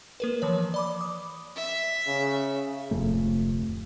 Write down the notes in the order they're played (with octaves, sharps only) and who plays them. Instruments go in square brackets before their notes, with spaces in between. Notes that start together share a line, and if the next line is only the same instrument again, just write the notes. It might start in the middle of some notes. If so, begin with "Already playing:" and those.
[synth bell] A#3 A#4 B4
E3 F3 C#5
D5 B5 D6
D#6
[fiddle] E5
[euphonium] C#3
[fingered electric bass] D1 F2 C3 A3